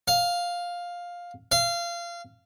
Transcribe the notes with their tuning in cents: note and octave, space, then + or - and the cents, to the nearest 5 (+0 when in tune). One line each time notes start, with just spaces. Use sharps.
F5 +10
F5 -20